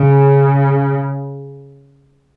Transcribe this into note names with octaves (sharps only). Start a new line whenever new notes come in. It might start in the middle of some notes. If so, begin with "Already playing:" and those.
Already playing: C#3